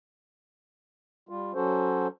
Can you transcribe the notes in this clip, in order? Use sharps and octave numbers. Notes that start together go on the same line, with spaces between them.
G3 F4
F#3 C#4 F#4 A4 C5